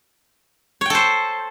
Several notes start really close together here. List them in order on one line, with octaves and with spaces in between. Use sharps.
C#5 G5 A4 C5